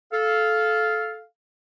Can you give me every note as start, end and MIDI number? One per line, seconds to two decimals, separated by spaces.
0.12 1.23 69
0.12 1.23 77